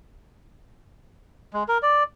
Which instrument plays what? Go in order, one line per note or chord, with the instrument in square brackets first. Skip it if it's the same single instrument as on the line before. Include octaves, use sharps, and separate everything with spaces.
[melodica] G#3
A#4
D5